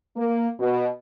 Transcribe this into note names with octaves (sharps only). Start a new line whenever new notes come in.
A#3
B2